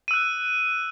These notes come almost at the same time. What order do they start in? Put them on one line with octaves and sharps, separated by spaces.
D#7 E6 F#6